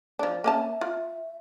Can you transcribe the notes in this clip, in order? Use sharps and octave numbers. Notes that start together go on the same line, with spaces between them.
F3 D4
A#3 C#4 E5 A5
F4